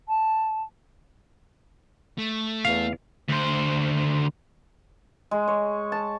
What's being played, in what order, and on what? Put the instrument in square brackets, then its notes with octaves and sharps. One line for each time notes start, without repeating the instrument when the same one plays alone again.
[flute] A5
[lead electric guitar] A3
[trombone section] E2 [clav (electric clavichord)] F5
[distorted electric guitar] D2 C5
[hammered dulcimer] G#3
C#5
A5